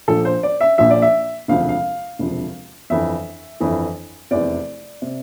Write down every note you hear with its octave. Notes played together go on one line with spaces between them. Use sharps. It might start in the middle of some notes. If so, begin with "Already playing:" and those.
A#1 A#2 F3 A4
C5
D5
E5
A#1 A#2 F3 E5
D5
E5
E1 D2 C3 F3 F5
F5
E1 D2 C3 F3
G1 F2 E3 E5
G1 F2 E3
F1 E2 C3 D5
C3